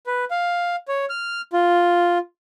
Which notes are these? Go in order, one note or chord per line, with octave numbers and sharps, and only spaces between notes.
B4
F5
C#5
F6
F4